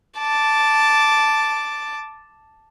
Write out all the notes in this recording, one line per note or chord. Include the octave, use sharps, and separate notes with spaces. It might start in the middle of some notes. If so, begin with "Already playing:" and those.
A5 D6